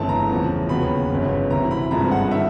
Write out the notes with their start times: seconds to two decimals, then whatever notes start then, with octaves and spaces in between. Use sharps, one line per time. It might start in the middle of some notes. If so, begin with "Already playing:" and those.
Already playing: G1 F2 C#3 E3 A3 A5
0.09 A#5
0.29 E2 C#3 F3
0.69 D#2 C#3 F#3 B3 B5
1.10 G1 F2 C#3
1.51 D2 C3 E3 A#5
1.71 B5
1.91 G#1 G2 D3 F3 G#3 A#5
2.11 F#5
2.31 D#3 E5